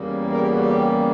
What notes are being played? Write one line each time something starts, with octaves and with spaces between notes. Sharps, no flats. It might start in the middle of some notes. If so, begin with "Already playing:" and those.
Already playing: E2 C#3 G3 A#3
A#4
G4
F#4
G4